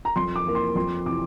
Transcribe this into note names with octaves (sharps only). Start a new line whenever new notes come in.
A#5
F2 C6
D6
E3 A#3
C6
F2 C6
C3 E3 D6